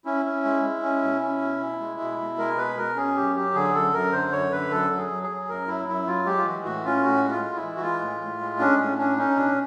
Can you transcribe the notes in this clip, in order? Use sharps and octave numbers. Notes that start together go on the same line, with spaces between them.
C#4 E4
C#4
G#3
G#3
C#4
B2
C#4
B2
B2
G#3
B2
B2
G#3 A#4
B2 B4
B2 A#4
C#4 G#4
F#2 G4
F#3 G4
D3 G#4
F#2 A4
F#2 A#4
D3 C5
F#2 C#5
D3 B4
F#2 A4
F#3
G#4
F#3
G#4
F#3
F#2 A#4
F#3 E4
F#2 E4
F#3 F4
G#3 G4
F4
E3 F#4
A2 F#4
C#4 F4
A2 F#4
G#3
F4
G#3
E4
E3
F#4
G#3 F4
A2
A2
G#3
C#4 D4
A2 C#4
C#4 D4
C#4 D#4
B2 D4